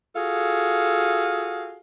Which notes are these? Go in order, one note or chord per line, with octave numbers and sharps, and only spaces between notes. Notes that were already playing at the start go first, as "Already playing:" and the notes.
F4 F#4 G#4 A4 F5